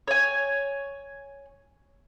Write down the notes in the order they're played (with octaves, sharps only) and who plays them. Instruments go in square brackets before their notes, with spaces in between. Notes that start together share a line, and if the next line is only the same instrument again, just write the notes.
[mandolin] C#5 G#5